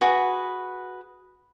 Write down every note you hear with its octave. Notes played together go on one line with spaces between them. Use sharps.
F#4 G#4 B4